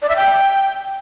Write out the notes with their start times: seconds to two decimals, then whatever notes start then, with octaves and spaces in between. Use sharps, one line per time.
0.02 D5
0.09 E5
0.16 G5